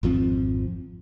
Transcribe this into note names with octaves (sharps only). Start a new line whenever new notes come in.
G#1 F2 F3 C4